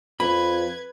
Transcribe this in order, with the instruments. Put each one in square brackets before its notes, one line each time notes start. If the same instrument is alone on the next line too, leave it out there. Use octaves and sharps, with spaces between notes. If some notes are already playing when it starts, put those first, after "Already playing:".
[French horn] F2 [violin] B4 G#6 [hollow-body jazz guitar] B5